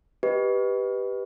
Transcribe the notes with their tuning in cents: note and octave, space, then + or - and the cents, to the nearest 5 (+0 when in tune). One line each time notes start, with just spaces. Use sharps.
G4 +0 B4 +0 D#5 +5